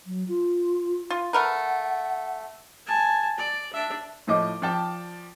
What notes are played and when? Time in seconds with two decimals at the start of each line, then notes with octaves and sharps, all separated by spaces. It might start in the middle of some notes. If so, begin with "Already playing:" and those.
0.06 F#3
0.28 F4
1.10 F4
1.33 A3 A#4 B4 F#5
2.86 G#5 A5
3.37 D5
3.73 D4 E5
4.27 A2 F3 D#5 D6
4.62 F3 D5 G5 A5